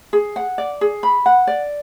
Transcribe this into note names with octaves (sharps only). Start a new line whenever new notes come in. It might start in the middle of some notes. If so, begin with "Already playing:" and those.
G#4
F#5
D5
G#4
B5
F#5
D5